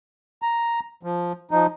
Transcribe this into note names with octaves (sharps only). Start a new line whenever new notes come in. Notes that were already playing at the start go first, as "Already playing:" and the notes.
A#5
F3
F3 D#4